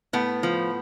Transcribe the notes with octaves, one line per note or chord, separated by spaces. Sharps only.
A2 B3
F3